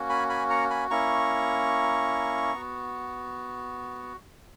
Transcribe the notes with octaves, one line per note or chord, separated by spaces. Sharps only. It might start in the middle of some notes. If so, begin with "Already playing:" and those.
Already playing: A#3 C#4 F#4
G#5 B5
G#5 B5
F#5 A#5
G#5 B5
A#3 C#4 E4 A#5 C#6
B3 F#4